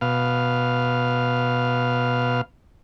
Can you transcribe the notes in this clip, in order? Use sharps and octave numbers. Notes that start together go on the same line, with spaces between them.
B2 F5